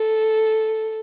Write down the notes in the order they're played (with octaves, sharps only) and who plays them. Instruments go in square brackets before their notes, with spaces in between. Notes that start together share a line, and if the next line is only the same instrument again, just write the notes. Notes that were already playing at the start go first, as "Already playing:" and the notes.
Already playing: [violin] A4